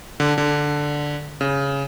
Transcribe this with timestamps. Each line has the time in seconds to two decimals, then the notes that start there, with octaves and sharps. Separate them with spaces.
0.20 D3
0.38 D3
1.41 C#3